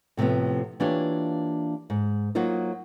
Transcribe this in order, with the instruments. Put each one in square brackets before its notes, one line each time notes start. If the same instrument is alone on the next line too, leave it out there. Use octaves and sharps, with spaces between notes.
[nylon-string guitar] A2 C3 F3 A3 B3
E3 A#3 D4 F4 G4 C#5
G#2
F#3 A#3 D#4 F4 C5